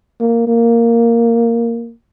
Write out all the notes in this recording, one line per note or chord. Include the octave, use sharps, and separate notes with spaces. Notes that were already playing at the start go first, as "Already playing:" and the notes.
A#3
A#3